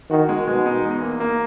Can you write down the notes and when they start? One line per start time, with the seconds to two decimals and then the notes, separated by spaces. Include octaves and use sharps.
0.10 D#3 F#4
0.29 G#3
0.47 B2 G#3
0.66 D#4
0.84 E2
1.02 A#3
1.20 A#3